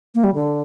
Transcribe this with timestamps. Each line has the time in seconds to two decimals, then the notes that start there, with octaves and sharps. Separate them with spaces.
0.15 A#3
0.24 G3
0.35 D3